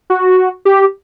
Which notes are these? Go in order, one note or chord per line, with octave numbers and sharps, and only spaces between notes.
F#4
G4